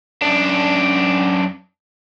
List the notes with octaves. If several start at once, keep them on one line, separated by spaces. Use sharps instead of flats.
F#2 D4